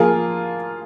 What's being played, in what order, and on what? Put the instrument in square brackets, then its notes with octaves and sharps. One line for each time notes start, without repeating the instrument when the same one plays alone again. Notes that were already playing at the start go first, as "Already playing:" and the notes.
Already playing: [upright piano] F3 A#3 G#4 [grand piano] F4 A#4